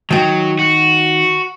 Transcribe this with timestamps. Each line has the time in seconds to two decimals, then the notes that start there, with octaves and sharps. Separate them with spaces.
0.11 D#3 F#3 G5
0.59 F#4